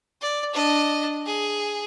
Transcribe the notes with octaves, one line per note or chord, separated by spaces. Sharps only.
D5
D4 D#5
G#4